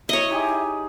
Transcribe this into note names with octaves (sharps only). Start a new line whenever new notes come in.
E4 C#5 D#5 E5
D#4 G4 G#4